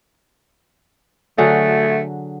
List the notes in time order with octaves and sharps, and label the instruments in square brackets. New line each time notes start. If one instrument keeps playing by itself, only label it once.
[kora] D3 F#3 G#4 [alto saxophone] A3